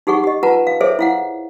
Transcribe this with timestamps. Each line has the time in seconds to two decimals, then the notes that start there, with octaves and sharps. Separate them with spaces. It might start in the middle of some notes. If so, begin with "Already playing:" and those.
0.07 D#4 G4 G#4 F#5 C#6
0.24 G4 D#5
0.43 F4 B4 F#5 A5 A#5
0.67 F5
0.81 G#4 A4 C5 C#5 E5
0.99 E4 F5 F#5